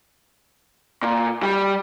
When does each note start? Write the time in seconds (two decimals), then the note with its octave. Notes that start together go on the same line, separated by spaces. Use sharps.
1.03 A#2
1.43 G3